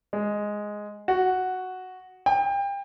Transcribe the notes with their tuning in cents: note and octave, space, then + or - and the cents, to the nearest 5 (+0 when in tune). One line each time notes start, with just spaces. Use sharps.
G#3 +0
F#4 +0
G5 +30